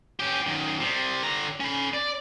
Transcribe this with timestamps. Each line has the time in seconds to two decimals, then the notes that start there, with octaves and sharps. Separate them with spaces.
0.20 C#4 G4
0.47 F#2 D#3
0.80 C3 G3
1.23 D3 A#5
1.60 C#4 B5
1.94 D5